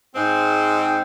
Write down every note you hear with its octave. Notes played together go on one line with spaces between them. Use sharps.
G#2 G#3 C4